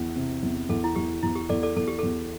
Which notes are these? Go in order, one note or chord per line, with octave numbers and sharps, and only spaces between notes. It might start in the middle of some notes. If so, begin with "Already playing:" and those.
Already playing: E2
C3
E2
E2 A4
E4
E2 G4
E2 E4
G4
E2 A4 D5
A4 D5
E2 A4
G4
A4
E2